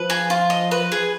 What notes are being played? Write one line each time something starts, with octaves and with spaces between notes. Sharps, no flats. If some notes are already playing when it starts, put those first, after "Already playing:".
Already playing: F3 B4
G#4
F4
D#5
B4
G#4